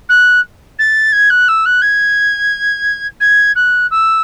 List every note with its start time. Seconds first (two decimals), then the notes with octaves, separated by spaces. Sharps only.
0.09 F#6
0.78 A6
1.12 G#6
1.29 F#6
1.48 E6
1.65 F#6
1.81 G#6
3.20 G#6
3.55 F#6
3.91 E6